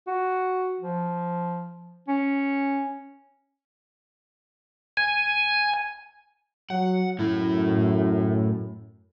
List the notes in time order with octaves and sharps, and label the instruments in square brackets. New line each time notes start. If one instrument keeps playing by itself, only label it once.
[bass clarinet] F#4
F3
C#4
[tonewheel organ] G#5
[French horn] F#3 [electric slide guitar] F#5
[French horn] F#2 [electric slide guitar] A2 A3 E4